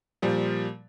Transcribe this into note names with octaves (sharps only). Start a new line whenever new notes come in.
A#2 F3 G3